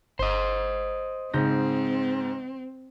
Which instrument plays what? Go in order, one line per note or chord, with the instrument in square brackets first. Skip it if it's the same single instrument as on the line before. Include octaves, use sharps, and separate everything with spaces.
[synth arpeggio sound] G1 [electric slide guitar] C5 D#5
[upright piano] G#2 [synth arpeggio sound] C#3 G6 A#6 [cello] C4